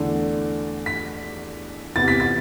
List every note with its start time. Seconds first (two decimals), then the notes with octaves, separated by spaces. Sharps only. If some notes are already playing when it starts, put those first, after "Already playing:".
Already playing: E2 D3 A3 D4
0.86 B6
1.96 E2 C3 E3 B3 A6
2.08 B6
2.20 A6